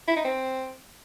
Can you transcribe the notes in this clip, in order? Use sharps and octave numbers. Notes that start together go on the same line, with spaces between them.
E4
D#4
C4